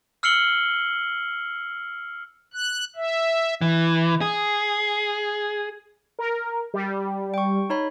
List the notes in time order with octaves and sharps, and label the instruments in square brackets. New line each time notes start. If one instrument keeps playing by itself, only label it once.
[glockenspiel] E6 F6 C7 C#7 F#7 G7
[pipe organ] F#6
E5
[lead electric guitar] E3
G#4
[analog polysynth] A#4
G3
[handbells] G5 C#6
D#4 C#5 B5